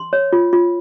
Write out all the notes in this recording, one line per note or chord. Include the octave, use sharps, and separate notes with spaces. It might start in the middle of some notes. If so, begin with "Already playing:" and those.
Already playing: C6
C#5
F4
F4